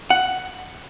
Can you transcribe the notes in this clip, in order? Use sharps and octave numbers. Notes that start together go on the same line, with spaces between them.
F#5